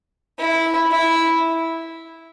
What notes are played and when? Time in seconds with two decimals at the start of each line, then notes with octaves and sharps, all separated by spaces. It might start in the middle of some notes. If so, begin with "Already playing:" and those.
0.39 E4
0.91 E4